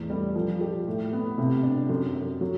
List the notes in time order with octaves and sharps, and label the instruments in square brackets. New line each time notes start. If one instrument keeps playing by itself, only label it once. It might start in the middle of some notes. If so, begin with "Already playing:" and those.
Already playing: [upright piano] E2 A2
G3
F3
G4
A2
B3
C3
D4
F#2
F#2
F#3